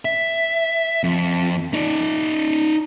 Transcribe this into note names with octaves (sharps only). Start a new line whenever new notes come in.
E5
F2
D#4 D5